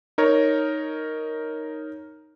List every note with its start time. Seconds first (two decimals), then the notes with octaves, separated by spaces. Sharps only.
0.18 D#4 A#4 C#5